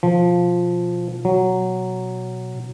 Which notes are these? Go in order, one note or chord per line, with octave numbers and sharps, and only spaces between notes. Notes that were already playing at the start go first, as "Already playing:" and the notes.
B2 F3
F#3